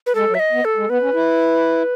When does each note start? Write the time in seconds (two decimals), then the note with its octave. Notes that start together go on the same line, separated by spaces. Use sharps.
0.06 B4
0.15 G#3 A4
0.28 F#3
0.35 E5
0.39 D#5
0.52 B3
0.65 A4
0.77 G#3
0.89 B3 B4
1.01 C#4
1.14 E4